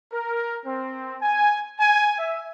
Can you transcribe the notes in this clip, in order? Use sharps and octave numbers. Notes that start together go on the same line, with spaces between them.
A#4
C4
G#5
G#5
E5